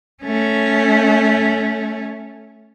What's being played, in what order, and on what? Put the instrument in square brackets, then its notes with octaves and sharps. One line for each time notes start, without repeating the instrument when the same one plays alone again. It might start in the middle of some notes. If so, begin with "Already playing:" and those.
[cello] A3 C#4